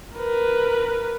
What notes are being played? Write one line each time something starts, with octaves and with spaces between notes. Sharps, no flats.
A#4 B4